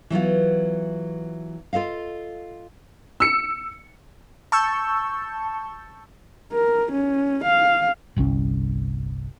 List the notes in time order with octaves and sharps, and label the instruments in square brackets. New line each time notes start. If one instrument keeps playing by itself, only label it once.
[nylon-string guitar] E3 F#3 B3 F4
F4 A4 D#5 F5
[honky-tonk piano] E6 C#7
[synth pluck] A5 C#6 E6 G6
[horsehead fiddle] A#4
C#4
F5
[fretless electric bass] G1 C2 C4 C#4